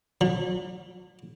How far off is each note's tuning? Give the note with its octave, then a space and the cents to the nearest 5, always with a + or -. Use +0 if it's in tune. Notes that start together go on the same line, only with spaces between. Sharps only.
F#3 -40